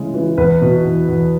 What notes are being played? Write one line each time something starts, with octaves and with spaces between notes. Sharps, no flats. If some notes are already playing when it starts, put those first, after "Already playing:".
Already playing: C#3 E3 G#3
E3
E2 B4
B2
E2
E2